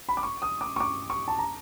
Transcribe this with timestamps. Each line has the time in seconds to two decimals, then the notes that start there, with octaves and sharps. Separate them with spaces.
0.09 B5
0.17 D6
0.23 C#6
0.42 D#6
0.61 D6
0.76 C#6
0.80 D6
1.10 C#6
1.28 A5
1.39 A#5